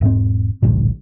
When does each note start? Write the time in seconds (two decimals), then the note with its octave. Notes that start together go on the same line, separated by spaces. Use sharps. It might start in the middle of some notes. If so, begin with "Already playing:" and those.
0.01 E1 G#2 C4
0.62 A1 D2 G2 A#2